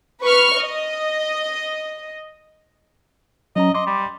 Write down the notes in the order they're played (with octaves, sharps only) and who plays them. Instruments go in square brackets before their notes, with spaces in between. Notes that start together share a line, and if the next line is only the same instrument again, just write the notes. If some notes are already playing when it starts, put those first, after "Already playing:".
[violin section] B4 C#6 F6
D#5
[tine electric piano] F#3 C#4 A#5 [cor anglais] D#5
[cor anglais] D#5 [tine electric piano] C6 D6
[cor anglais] G3